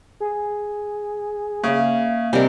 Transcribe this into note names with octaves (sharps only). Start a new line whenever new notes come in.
G#4
C#3 A#3 E5 F5
C3 G3 D4 A#4 D#5 G#5